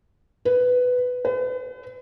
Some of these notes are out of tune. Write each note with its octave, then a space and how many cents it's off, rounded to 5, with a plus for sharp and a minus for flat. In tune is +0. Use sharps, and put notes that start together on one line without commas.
B4 +10
B4 +40